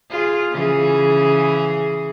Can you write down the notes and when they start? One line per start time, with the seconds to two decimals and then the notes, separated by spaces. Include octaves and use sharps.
0.10 F4 G#4
0.52 C#3 E3 G#4